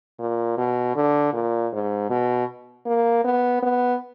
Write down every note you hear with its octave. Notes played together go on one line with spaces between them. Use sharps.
A#2
B2
D3
A#2
G#2
B2
A#3
B3
B3